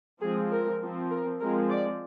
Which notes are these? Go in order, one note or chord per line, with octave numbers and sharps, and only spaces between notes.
F3 G#3 C4 G#4
A#4
F3 C4
A#4
F3 G#3 C4 A#4
D5